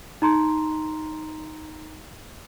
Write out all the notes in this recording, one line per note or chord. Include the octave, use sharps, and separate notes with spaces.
D#4 A#5 C6